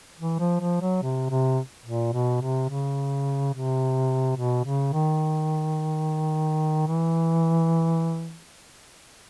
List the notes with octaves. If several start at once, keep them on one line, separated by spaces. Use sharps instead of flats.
E3
F3
F3
F#3
C3
C3
A#2
B2
C3
C#3
C3
B2
C#3
D#3
E3